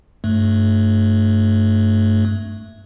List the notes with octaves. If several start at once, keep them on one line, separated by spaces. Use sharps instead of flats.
G2 A3